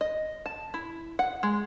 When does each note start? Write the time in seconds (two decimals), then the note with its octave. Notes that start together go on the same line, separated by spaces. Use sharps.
0.01 D#5
0.46 A5
0.74 E4
1.19 F#5
1.43 G#3